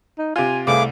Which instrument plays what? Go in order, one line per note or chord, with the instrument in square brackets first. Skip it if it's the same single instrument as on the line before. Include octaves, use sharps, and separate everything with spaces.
[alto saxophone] D#4
[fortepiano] C3 F4 [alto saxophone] G#5
[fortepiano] C2 [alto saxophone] A3 [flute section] G#4 B4 F5 [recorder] D6